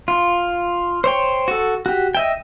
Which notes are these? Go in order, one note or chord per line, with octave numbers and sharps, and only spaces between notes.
F4
C5 C#5 G5
F#4 A4
F#4 G4
D#5 E5 G5